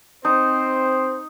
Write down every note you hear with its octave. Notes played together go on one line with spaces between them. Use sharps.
C4 D#4 C5